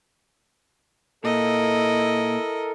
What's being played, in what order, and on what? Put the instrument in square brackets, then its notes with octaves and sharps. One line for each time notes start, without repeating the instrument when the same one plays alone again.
[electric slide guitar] A#2 [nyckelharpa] E4 D#5 [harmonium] A4 A#4